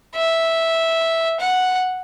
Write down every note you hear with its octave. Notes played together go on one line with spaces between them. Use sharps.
E5
F#5